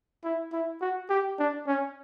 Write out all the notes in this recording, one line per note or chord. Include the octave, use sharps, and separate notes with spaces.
E4
E4
F#4
G4
D4
C#4